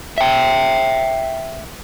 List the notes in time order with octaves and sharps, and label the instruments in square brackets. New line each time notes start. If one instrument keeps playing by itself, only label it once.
[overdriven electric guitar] E5 G5